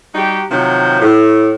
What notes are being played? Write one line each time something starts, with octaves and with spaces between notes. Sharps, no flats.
G3 D#4 F#4 G4
C3 D#3 F3 F#3
A2